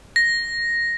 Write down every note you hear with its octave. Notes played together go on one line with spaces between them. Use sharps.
A#6